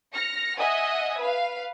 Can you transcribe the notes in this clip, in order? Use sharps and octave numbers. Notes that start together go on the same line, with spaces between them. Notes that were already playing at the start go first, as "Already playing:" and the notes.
F6 A#6 C#7
D#5 E5 F#5 G#5 D#6
B4 F5